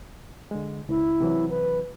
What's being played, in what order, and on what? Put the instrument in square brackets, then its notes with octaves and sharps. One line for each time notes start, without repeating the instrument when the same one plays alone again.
[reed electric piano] D3 G#3
[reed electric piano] C#2 [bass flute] E4
[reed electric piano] C3 E3 F#3
[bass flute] B4